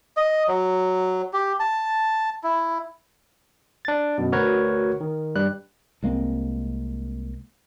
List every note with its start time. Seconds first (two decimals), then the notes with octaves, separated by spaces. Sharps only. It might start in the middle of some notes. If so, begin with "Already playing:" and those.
0.17 D#5
0.48 F#3
1.33 G4
1.60 A5
2.44 E4
3.85 D4 A6
4.18 F#2 B2
4.32 D2 F#4 A#4 B4 C#5
5.00 D#3
5.35 G2 G3 F#6
6.02 C2 G#3 A#3 C4